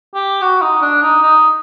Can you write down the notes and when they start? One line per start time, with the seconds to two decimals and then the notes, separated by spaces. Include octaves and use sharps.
0.15 G4
0.42 F#4
0.62 D#4
0.82 D4
1.02 D#4
1.22 D#4